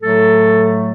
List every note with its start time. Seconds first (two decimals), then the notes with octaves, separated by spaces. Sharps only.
0.01 A2 F#3 A3 A4